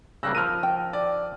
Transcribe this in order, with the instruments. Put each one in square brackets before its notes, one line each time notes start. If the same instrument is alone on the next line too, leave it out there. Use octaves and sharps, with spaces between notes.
[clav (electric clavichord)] C#3 G3 A#3 [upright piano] E6 F#6 A#6
[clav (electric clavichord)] F3 A#4 [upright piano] F6 D#7
[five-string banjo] G5
[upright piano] D5